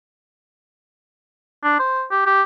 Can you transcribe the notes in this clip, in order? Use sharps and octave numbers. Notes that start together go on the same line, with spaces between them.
D4
C5
G4
G4